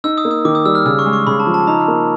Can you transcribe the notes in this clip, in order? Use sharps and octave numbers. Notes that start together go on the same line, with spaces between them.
D#4 E6
D#6
A#3
D#6
D#3 D6
D#6
G3 E6
F6
C#3 E6
C#6
G#3
C#6
C#3 B5
A5
F3
A5
D#4 A#5
A#3